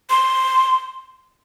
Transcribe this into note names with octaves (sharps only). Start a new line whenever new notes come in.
C6